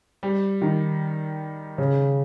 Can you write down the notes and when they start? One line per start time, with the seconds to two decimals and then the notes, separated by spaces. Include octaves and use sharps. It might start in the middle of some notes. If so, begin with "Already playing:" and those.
0.23 G3
0.62 D#3
1.78 C#3